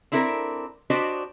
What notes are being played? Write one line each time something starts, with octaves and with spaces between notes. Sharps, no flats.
C4 D4 E4 A4 A#4
D4 F#4 G4 C5 D5 D#5